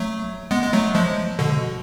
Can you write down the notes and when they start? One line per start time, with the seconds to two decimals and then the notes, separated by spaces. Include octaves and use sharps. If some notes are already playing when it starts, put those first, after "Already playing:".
Already playing: F#3 A3
0.51 G#3 B3
0.63 G#3
0.73 F#3 A3
0.95 F3 G#3
1.39 B2 D3